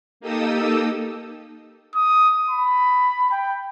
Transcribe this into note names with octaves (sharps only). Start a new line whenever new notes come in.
A#3 D#4 G4 A4 D#6 E6
D#6
B5
G5